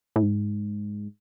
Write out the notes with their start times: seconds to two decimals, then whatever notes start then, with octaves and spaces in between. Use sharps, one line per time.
0.16 A2
0.22 G#2